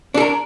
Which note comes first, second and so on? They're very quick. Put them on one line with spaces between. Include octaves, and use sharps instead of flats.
D4 A4 A#4